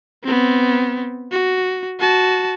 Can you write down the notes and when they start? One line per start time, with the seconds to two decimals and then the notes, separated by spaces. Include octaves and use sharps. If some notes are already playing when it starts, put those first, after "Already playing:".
0.23 B3 C4
1.31 F#4
1.99 F#4 A5